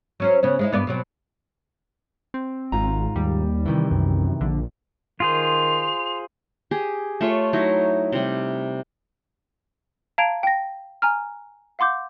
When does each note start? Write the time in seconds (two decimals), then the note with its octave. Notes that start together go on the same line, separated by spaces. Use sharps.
0.20 F#3 C#4 C5
0.43 C#3 B3 C#4
0.59 G#3 D#4 E4
0.72 G2 B3 D5
0.87 B2 F#3 C4
2.34 C4
2.72 G#1 G#2 F4 A#5
3.16 D#2 G3
3.66 C3 D#3 E3
3.91 C2 F#2
4.41 A#1 D3
5.20 D#3 F4 G#4 C5 C6 F7
6.71 G4 G#4
7.21 A3 F4 C#5 C#6
7.53 F#3 D#4 E4
8.13 C3 G3
10.18 F5 A5 A#5 G#6 D7 F7
10.43 G5 A#6
11.02 G#5 A#5 F6
11.79 F5 F#5 C6 D6 G6